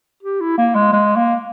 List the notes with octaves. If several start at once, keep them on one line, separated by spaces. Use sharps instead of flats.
G4
E4
A#3
G#3
G#3
A#3